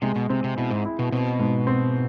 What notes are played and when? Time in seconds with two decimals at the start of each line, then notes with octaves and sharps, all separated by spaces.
0.02 C3 G#3
0.16 B2
0.30 C3 C4
0.44 C3
0.57 B2 E4
0.70 G#2
0.85 E4
0.99 B2
1.12 B2 C4
1.39 G#2
1.67 C4